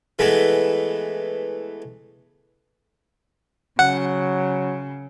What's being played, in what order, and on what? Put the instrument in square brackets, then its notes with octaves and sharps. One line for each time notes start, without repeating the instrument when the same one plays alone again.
[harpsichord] E3 G#3 A3 B3
[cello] C#3 [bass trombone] F#3 [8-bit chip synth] F#5